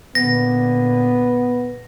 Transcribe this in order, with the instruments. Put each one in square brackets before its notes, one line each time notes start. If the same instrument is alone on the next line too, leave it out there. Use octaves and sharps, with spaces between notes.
[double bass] A#2 D3 [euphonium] B3 [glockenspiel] A#6